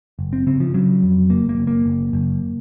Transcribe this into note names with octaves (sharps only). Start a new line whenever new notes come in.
F#1
C4
C#3 C4
F3
C#3 F#3
F2
F#1 A#3
A#3
F#1
A#3
F#1
F#1